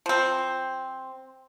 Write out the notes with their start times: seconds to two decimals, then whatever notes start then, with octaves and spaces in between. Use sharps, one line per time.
0.06 F3 C4